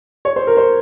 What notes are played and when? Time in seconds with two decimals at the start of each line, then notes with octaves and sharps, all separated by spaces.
0.25 C#5
0.36 C5
0.47 A#4
0.57 C5